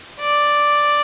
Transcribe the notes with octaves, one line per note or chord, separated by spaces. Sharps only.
D5